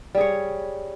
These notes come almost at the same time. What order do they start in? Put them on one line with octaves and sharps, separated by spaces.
G3 G#4 C#5